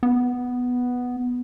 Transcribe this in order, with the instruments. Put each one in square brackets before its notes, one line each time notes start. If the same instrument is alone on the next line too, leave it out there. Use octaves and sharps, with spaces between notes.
[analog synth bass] B3